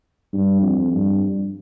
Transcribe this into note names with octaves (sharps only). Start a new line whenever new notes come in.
G2
F2
G2